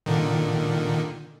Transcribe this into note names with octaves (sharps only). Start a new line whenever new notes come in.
A#2 D3 D#3